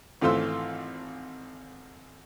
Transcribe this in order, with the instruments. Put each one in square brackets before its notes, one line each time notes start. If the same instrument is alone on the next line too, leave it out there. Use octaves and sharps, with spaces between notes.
[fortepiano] G#1 E3 A3 F4 C5 E6